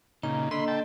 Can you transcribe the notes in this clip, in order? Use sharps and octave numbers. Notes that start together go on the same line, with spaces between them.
A#2 C#3 D#4 A#5
D3 A#3 D#5 B5 C6
G5 A5